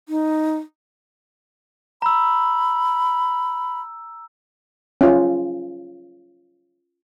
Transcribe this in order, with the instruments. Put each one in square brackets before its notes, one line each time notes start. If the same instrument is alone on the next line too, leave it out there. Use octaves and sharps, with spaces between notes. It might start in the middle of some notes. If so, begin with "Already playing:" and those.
[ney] D#4
[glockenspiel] A#5 E6 [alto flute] B5
[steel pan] C#4 F4